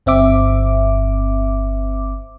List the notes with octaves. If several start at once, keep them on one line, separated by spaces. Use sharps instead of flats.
G1 C4 E5 D6